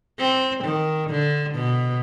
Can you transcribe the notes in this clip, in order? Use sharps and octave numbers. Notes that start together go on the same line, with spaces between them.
C4
D#3
D3
B2